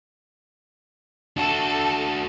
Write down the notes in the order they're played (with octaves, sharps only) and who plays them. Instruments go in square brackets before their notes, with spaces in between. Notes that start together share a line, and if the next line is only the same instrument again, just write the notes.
[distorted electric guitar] D4 F#4 [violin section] A4